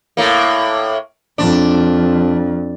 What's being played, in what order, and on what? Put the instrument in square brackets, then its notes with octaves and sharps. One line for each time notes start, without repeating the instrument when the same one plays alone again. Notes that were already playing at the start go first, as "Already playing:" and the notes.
[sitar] A2 A#3
[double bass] F2 [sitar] D4